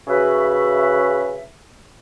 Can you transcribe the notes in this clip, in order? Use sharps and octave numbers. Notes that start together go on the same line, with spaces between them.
C#3 F#4 B4 E5